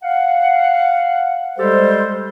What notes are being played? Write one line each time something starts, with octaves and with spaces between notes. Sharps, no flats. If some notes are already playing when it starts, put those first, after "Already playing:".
F5 F#5
G3 G#3 G4 A4 C5